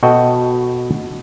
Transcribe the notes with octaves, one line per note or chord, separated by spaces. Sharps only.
B2 F#4 A4 D#5 G5